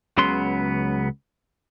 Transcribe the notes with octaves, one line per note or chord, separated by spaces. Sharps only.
C#2 C#3 F#3 B3 C6